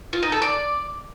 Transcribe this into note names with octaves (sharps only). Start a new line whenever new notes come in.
F4
D#4
A4
D5